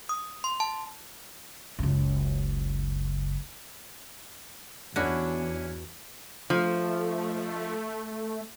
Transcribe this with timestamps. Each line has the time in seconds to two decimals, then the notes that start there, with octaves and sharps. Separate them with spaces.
0.09 D#6
0.44 C6
0.60 A5
1.79 F#1 C#2
4.96 E2 C#4 D4 E4 F#4
6.50 F3 A3